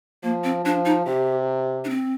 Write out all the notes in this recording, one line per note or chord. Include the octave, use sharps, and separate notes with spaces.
F3 A#3
C4
F3 D4
D#4
C3 G4
D4
C4